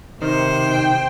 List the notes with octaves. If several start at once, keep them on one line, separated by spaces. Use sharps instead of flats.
C3 D#3 C5
G5